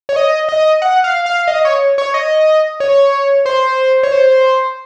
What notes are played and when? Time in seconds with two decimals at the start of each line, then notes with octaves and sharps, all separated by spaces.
0.09 C#5
0.16 D#5
0.49 D#5
0.82 F#5
1.04 F5
1.26 F5
1.47 D#5
1.65 C#5
1.98 C#5
2.14 D#5
2.80 C#5
3.46 C5
4.03 C#5
4.12 C5